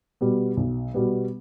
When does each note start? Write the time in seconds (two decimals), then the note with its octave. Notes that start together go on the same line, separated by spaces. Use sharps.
0.21 B2 G3 B3
0.57 B1
0.94 B2 G3 B3